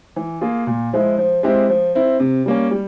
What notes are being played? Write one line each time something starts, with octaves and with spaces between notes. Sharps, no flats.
E3
A#3 F4 G#4
A#2
F3 G#3 E4
F3
G#3 C4 E4 G4
F3
C4 E4
C3
G3 A#3 C#4
G3